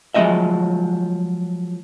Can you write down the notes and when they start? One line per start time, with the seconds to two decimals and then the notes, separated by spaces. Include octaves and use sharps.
0.14 F3 F#3 G#3 C4 D#5 E5